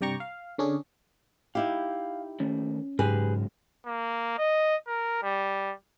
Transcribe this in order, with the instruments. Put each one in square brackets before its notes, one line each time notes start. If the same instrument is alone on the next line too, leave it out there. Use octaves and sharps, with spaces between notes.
[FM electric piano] G2 C3 D5 G5 A#5 C#6
F5
D3 C#4 D4 G#4
[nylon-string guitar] D#4 E4 G4 [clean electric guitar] F5
[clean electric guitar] D#3 A3 A#3 [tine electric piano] C#4
[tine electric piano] G#2 [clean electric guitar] C#3 F#3 G#3 [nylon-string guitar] G4 G#4 B4
[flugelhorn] A#3
D#5
A#4
G3